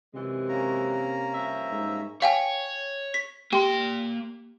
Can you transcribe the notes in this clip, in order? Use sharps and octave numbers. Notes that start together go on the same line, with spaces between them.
F#2 C3 E3 G#3
A#3 C#4 A#5
G2 F3 E5
G#2
C#5 F5 G5 G#5
B6
A#3 G4 G5 C6